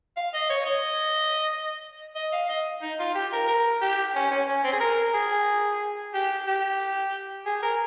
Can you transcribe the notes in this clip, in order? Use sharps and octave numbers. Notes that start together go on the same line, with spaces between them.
F5
D#5
C#5
D#5
D#5
F5
D#5
D#4
F4
G4
A#4
A#4
G4
C#4
C#4
C#4
C4
G#4
A#4
G#4
G4
G4
G#4
A#4